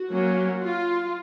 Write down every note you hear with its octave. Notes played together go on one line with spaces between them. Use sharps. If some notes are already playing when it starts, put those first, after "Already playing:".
Already playing: F#4
F#3 A#3 C#4
F4